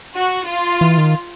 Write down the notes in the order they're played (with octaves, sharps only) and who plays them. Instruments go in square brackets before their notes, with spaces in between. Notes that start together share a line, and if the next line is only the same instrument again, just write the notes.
[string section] F#4
F4
[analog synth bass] E3
D#3